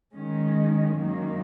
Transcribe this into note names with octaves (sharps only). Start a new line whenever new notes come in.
D#3 G#3 C#4
F#2 D#3 A#3